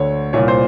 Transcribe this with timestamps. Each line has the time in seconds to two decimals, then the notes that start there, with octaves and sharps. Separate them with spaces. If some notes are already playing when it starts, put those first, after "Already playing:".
Already playing: D2 D3 C#5
0.33 C2 A#2 C#5
0.48 C5